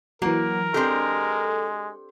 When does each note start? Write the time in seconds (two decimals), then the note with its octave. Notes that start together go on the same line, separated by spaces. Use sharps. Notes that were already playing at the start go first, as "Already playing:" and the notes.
0.22 E3 F#3 A#3 F#4 A#4
0.74 G#3 C4 D4 G4 A4